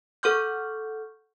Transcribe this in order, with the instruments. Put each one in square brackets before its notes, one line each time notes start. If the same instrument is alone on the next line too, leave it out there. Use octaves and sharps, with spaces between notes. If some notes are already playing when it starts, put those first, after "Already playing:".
[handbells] A4 F#5 C#6 F6 G6